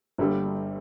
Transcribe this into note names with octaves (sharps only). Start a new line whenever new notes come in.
G1 G2 D3 G3